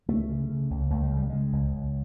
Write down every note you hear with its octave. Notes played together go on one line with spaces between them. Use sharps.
C#2 A3
C#3
C#3
C#2
C#2 A3
G#3
C#3 G3
C#3 G#3
C#2
C#2